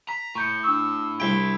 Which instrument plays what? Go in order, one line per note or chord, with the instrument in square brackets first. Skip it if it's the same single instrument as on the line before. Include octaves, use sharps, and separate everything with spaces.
[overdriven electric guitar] A#5 [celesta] B6
[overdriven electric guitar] A2 [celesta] C#6 G6 C#7
[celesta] D4 C#6 [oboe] E6
[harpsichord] C2 G5 [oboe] E4